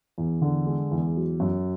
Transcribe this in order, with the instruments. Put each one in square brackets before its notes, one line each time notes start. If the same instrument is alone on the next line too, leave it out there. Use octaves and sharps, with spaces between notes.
[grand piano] E2
D3
G#3
E2
F#3
F#2